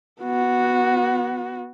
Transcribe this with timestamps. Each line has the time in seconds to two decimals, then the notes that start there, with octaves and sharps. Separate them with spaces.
0.21 B3 F#4